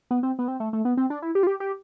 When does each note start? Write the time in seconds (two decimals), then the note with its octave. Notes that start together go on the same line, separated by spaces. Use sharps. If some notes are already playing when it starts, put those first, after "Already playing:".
0.11 B3
0.23 C4
0.39 B3
0.48 C4
0.60 A3
0.73 A3
0.85 B3
0.97 C4
1.10 D4
1.22 E4
1.35 G4
1.43 F4
1.47 G4
1.60 G4